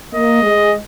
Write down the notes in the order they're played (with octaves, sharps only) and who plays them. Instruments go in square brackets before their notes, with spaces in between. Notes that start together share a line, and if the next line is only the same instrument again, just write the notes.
[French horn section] A#3 [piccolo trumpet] D#5
[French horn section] G#3